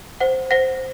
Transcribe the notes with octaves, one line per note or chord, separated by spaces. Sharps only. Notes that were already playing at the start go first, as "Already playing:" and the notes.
C5 F#5
C5 F#5 A#6